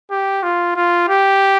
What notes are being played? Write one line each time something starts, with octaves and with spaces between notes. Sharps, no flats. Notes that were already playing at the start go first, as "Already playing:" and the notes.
G4
F4
F4
G4